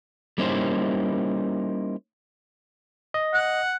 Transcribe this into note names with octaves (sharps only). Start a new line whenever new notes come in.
G3 A#3 C#4 D#4 E4 C5
D#5
F#5